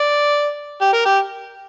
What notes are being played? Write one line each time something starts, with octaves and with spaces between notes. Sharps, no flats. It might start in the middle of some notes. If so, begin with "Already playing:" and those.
Already playing: D5
G4
A#4
G4